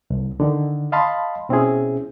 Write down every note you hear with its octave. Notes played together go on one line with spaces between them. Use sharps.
C2
D3 D#3
D#5 F5 A5 B5 C6
B2 C4 C#4 E4 G#4